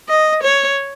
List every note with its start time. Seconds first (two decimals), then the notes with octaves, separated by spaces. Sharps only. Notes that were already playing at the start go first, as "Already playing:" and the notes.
0.09 D#5
0.43 C#5